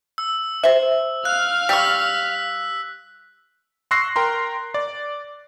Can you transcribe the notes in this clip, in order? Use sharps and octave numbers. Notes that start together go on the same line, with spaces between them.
E6
C5 E5
F5 F6 F#6
G3 C#6 E6 B6
C6 C#6 E6 F#6 A#6 C7
A#4 G5 A#5 C6
D5